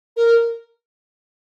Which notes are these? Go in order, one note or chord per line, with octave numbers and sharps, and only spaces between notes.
A#4